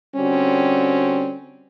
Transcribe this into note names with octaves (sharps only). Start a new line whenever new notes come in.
D3 G3 C4 C#4 F#4